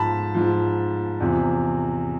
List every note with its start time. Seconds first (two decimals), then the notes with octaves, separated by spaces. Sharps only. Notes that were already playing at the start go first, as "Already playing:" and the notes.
Already playing: G#2 F3 A5 B5
0.34 G#2 F3
1.20 E2 C3 F3